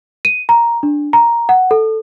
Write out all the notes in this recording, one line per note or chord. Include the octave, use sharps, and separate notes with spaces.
D#7
A#5
D4
A#5
F#5
A4